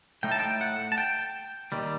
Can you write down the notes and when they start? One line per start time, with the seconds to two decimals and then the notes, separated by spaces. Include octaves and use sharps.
0.23 A2 A3 D#4 G5
0.32 A5
0.40 G5
0.61 F#5
0.92 A5
0.98 G5
1.72 D#2 D#3 G3